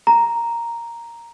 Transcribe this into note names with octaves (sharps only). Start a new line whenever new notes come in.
A#5